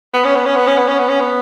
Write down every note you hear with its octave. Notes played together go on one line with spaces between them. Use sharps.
B3
C#4
B3
C#4
B3
C#4
B3
C#4
B3
C#4
B3